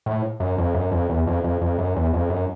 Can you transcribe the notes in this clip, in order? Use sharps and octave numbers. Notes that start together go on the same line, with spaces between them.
A2
F#2
F2
F#2
F2
E2
F2
F2
F2
F#2
E2
F2
F#2